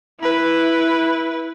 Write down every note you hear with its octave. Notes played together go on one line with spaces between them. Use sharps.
E4 B4